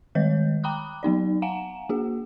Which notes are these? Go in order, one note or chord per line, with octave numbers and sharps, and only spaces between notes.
D#3 G#3 C#5 D#5 G6
G5 A#5 B5 D6 D#6 F#6
F#3 B3 D#4 D5
F5 F#5 G#5 A#5 E7
A#3 F#4 G#4